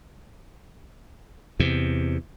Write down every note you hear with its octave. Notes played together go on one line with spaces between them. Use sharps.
E2 C3